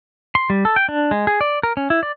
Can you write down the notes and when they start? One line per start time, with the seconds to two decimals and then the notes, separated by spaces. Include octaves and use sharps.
0.35 C6
0.50 G3
0.65 A4
0.76 G5
0.89 D4
1.11 G#3
1.27 G#4
1.41 D5
1.63 A#4
1.77 C#4
1.90 E4
2.03 D5